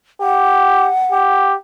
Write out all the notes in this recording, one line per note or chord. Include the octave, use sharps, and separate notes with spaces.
G4 F#5
G4